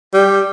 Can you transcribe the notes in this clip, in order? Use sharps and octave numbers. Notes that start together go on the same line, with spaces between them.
G3